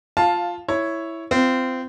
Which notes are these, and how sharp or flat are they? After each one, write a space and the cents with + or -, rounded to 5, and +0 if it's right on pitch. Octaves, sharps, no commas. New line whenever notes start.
F4 +0 F5 +10 A5 -5
E4 +0 C#5 +0
C4 -20 F4 -20